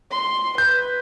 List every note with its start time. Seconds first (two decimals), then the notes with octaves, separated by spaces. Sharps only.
0.12 C6
0.58 B4 G6